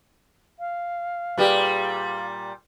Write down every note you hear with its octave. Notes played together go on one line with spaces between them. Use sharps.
F5
A#2 G3 G4 G#4 B4